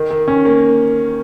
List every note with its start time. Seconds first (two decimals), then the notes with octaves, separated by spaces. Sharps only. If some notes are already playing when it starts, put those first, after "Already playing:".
Already playing: D#3
0.11 D#3
0.28 C#4
0.45 A#3